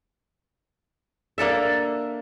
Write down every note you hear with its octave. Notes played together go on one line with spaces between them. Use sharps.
A#3 D4 A4 E5